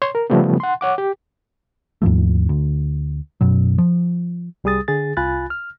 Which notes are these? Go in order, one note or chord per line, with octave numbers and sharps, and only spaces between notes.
C#5 C6
A#4
C#3 F3 G3 A3 B3
F#5 C6
C#5 F#5 D6
G4
D#2 G#2 F3 A3
D2
F#2 B2 F#3
F3
C2 G3 G#4 D#6 A6
D3 G#4 A6
C2 F4 G#5 B5 F#6 A6
F6